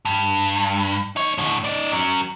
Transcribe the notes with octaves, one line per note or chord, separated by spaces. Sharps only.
G2
D#4 C#5
A2 D3
D#4 D5
F#3 C#4